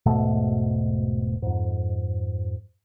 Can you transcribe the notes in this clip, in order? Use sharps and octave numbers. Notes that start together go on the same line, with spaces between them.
E1 G#2 B2 A3
F2 G#2